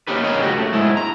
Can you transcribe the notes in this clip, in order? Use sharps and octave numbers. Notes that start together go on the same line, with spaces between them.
A#3 C#4 D#4 G4 B4
C#4 G4 G#4 A#4 C#5 D#5
C#2 F#4 G4
A3
G#2 G#3 E4
A#5